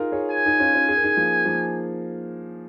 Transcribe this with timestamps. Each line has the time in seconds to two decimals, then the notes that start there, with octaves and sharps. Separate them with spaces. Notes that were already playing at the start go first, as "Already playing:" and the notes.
Already playing: D#4 F4 G#4 A#4
0.12 G#4 C#5
0.31 G#5
0.46 D#4 G#4
0.60 C#4 F4
0.74 C#4 F4
0.88 G#4
0.97 A#4
1.04 D#4 G#4
1.17 F3 A#3
1.46 F3 A#3